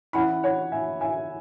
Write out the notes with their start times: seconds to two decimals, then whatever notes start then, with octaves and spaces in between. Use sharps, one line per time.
0.13 E3 C#4 E4 F#5 B5
0.43 C#5 F#5
0.72 E5 G#5
1.01 E5 G#5